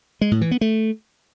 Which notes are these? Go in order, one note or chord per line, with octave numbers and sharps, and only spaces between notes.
G#3
A2
E3
B3
A3